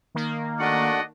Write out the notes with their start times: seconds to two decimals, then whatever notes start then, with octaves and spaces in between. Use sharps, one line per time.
0.15 D#3 A#3
0.60 A3 D4 F#4 D5 D#5 F#5